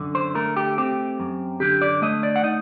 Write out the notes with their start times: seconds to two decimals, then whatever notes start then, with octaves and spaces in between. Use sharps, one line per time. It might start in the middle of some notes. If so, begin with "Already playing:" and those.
Already playing: F#2 D3
0.15 C5
0.35 A3 A#4
0.56 G4
0.78 C4 G4
1.20 F#2
1.60 D3 G4
1.82 D5
2.02 A3 D#5
2.23 D5
2.36 F#5
2.43 D#4 D#5